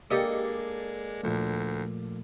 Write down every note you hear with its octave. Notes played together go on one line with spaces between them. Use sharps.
G#3 A#3 D4 G4 A4 D#5 C#7
D2 A#2 F3 A3